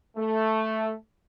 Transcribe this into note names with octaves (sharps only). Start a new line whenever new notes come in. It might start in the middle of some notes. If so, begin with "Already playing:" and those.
A3